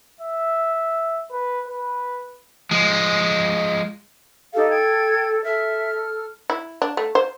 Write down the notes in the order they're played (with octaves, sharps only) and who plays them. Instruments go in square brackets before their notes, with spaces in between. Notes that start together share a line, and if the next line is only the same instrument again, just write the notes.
[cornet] E5
B4
B4
[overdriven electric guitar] F3 G#3
[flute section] D#4 G4 F5 [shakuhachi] A4
[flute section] G5 G#6
[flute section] A4 F6 [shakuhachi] E5
[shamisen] E4
D4
A3
C5